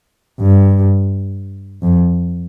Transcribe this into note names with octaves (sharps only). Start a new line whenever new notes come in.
G2
F2